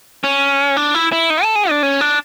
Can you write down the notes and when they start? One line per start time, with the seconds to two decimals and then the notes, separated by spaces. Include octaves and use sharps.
0.24 C#4
0.77 D4
0.95 E4
1.12 E4
1.30 D#4
1.43 A4
1.55 G#4
1.70 D4
1.83 C#4
2.01 D4